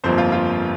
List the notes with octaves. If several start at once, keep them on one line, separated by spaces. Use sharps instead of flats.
G1 F2 F3 A#3 C5
F4
F4